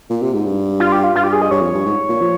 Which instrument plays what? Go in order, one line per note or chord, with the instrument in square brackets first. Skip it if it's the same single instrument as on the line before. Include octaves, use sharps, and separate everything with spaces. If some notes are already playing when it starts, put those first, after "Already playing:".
[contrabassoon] A#2
C3
G#2
G2
[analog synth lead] F4
G4
F4
[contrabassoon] G2 [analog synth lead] F4
[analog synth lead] G4
G#4
D#5
[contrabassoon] G2 [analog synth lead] C#5
[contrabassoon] F2
G2
G#2
A#2
F3